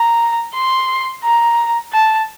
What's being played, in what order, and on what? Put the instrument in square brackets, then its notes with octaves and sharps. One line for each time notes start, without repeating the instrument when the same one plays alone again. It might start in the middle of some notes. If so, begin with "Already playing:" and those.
Already playing: [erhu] A#5
C6
A#5
A5